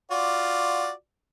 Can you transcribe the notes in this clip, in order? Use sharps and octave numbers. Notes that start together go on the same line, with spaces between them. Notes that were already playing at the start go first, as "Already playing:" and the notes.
F4 F#4 D5